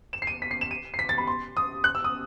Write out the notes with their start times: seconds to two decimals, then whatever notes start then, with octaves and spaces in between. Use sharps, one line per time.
0.13 E7
0.22 C7
0.27 D#7
0.42 B6
0.51 C7
0.61 E7
0.71 D#7
0.94 C7
0.99 B6
1.09 A6
1.18 B5
1.27 C6
1.57 D#6
1.84 F#6
1.95 E6
2.04 D#6